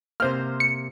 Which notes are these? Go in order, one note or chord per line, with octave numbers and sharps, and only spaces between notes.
C3 A#3 C5 F6
C#7